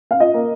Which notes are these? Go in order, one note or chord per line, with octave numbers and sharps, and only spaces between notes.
F5
F4 D#5
A#3